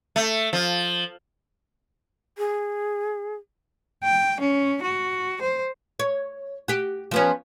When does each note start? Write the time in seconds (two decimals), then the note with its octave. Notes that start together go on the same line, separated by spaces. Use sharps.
0.16 A3
0.53 F3
2.38 G#4
4.04 G5
4.41 C#4
4.83 F#4
5.42 C5
5.99 C#5
6.68 F#4 G4
7.11 F3 B3 C#4